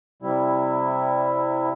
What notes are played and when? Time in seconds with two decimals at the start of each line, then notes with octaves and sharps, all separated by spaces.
0.22 C3 G3 E4